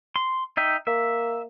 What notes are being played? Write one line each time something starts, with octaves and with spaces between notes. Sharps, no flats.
C6
D#4 E5 G5
A#3 E5